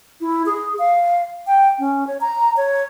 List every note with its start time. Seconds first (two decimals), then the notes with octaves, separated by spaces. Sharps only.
0.21 E4
0.46 G#4
0.79 F5
1.47 G5
1.79 C#4
2.07 C#5
2.21 A#5
2.57 C#5